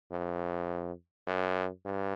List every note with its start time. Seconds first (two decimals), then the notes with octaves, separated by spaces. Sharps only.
0.11 F2
1.27 F#2
1.85 G2